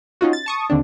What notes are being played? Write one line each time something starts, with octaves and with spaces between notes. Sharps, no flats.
C#4 D#4 F4 F#4
A6
A5 C#6 D#6
D#2 D3 C4 D4